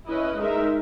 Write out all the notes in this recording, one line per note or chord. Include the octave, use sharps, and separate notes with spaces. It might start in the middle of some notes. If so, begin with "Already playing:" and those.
C#4 E4 B4 D#5
G#3 D#4 A#4 E5